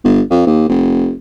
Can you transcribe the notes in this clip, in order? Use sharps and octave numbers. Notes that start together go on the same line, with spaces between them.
G1
F2
D#2
F1